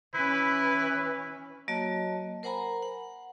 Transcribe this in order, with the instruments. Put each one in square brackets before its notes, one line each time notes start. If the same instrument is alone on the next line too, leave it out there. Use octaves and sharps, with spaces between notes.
[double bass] E3 C#4 [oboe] E4 [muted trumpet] B4
[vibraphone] F#3 A#3 F#4 C#5 D#5 A5
A#4 C5 F#5 G#5 A#5 B5
F#5